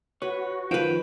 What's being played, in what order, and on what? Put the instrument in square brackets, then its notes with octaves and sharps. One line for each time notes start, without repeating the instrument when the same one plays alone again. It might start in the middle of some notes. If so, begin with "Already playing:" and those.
[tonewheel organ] F#4 [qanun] B4 [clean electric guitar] C#5
[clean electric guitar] C2 F#2 [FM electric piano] D#3 F3 [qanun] B4 G5